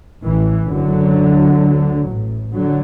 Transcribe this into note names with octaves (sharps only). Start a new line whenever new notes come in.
A1 A2 E3
F#1 F#2 D3 F#3
D2
D2
A1 A2
D3 F#3